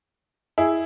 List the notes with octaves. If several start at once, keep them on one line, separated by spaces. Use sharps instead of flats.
E4 G#4